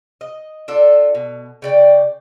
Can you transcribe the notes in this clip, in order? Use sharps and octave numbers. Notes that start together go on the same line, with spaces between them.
D#5
D4 F4 A4
B2
C#3 D5 G5